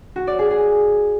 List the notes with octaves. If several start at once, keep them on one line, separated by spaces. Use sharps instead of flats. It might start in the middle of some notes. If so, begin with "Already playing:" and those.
F#4
D5
G#4
G#4